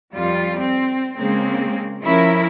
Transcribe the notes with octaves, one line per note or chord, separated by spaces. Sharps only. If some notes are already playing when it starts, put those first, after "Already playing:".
F2 G3 F4
C4
C#3 G#3 A#3 C4
F3 C#4 E4 A#4